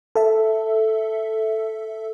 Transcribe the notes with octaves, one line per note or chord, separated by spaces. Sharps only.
A4 E5